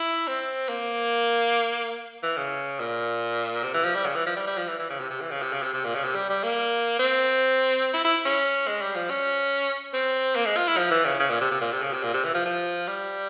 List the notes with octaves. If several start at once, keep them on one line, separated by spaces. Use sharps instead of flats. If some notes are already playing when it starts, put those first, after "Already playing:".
Already playing: E4
C4
A#3
E3
C#3
A#2
C3
E3
F3
G3
C#3
E3
F3
G3
G3
F3
E3
E3
C#3
C3
C3
E3
C#3
C3
C#3
C3
C3
A#2
C#3
C3
G3
G3
A#3
C4
E4
E4
C#4
G#3
G3
F3
C#4
C4
A#3
G#3
F4
E4
F3
E3
C#3
C#3
A#2
C3
C3
A#2
C3
C#3
C3
A#2
C3
E3
F3
F3
G3